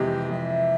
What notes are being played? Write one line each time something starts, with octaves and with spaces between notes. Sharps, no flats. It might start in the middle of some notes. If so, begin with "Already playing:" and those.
Already playing: F2 C3 E3 G#3 G4
F2 E5